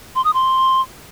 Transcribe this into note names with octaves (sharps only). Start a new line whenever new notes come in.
C6
D#6
C6